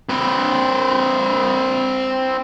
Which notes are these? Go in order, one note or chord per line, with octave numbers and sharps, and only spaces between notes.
C4 B4